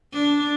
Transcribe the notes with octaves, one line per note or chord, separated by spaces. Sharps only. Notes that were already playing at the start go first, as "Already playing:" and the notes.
D4